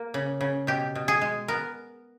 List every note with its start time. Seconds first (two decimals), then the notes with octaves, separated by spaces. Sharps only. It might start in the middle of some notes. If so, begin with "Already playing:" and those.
Already playing: A#3
0.14 C#3
0.41 C#3
0.67 B2 G4
0.95 B2
1.08 G#4
1.21 G#3
1.48 B3 A#4